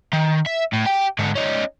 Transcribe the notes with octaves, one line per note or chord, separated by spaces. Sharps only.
D#3
E5
A2
G4 G5
G#2 D3
C#4 D#4